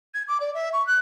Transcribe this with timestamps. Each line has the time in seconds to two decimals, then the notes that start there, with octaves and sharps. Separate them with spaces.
0.14 G#6
0.28 D6
0.40 D5
0.54 E5
0.73 C#6
0.86 F#6